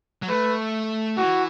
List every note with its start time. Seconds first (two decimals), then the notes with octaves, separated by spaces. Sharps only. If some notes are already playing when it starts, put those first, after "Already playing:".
0.23 F#3
0.29 A3 B4
1.17 E3 F#4